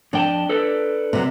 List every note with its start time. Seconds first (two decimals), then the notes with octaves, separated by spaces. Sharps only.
0.13 F2 D4 G5 A5
0.49 A4 B4 D5
1.13 C3 F#3